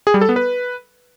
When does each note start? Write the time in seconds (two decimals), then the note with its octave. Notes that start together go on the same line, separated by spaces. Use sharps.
0.07 G#4
0.14 G3
0.21 A4
0.29 B3
0.36 B4